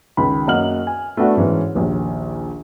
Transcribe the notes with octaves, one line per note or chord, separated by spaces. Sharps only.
C#2 D#3 B5
F#2 A#3 D#5 F#5 F6 F#7
G#5
A3 B3 D4 F#4 A4
G#2 E3 C#4
A#1 D#2